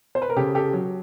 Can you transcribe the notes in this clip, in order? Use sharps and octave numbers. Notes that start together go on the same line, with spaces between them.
C5
B4
A#4
C#3 G4 A4
G4 A4
F#3